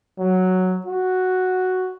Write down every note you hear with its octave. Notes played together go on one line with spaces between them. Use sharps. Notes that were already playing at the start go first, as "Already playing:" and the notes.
F#3
F#4